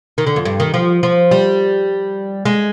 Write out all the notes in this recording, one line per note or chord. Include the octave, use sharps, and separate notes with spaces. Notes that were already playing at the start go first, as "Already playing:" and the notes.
D#3
D3
F2
G2
D#3
F3
F3
G3
G#3